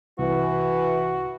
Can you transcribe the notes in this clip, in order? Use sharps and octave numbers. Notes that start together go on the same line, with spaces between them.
C2 E3 F#4